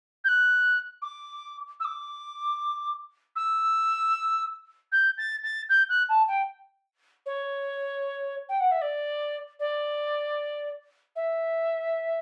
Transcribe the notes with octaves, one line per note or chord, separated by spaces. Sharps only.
G6
F#6
D6
E6
D6
E6
G6
A6
A6
G6
F#6
A5
G5
C#5
G5
F#5
E5
D5
D5
E5